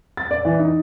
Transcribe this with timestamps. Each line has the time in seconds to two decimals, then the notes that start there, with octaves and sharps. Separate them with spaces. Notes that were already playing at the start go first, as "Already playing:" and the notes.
0.17 A6
0.31 D5
0.45 E3
0.59 D#4